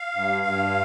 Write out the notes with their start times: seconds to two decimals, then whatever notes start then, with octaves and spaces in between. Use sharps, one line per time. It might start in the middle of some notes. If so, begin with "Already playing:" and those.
Already playing: F5
0.15 G2
0.45 G2